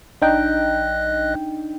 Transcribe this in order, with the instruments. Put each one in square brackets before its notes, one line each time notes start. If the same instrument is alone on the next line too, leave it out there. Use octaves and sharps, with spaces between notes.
[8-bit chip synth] A#1 D#5 F#6 [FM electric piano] D4 D#4 G5